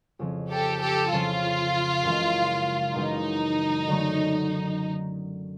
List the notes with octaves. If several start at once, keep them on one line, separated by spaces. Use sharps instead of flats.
F2 C#3 F3
G4 A4
G4 A4
F2 C#3 F3 F4
F#2 C#3 E3 G#3
F#2 C#3 E3 G#3 D#4
D3 F#3 A3